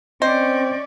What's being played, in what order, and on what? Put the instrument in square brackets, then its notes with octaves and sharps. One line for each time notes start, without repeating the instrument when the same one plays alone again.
[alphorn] C4 [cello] C#4 D5 [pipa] C5 [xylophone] D#5